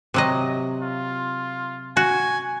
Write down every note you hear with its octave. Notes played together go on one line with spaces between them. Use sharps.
C3 F#3 D#5
F4
F#4 G#5